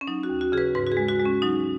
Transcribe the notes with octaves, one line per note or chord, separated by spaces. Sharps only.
C#4
F#3 D#4
F#4
D#2
F#4
C#3 G#4
B4
G#2 B4
F#4
G#4
G#3
F#4
G#3
C#4
F#3 D#4